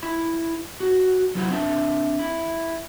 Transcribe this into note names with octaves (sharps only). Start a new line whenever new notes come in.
E4 B5
F#4
F#3 G3 E4 C5 F#5
C4 D4 E5 A5
E4